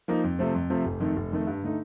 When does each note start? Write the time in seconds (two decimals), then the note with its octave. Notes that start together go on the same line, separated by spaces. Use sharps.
0.08 F3 A#3 D#4
0.24 F2
0.39 C3 F3 A3 C4
0.55 F2
0.70 C3 F3 A3 C4
0.85 F1
1.00 F2 D#3 A3
1.16 F1
1.32 F2 D#3 A3
1.47 G2
1.62 D3 A3 D#4